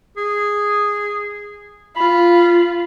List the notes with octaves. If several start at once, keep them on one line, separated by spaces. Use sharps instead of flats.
G#4
F4 B5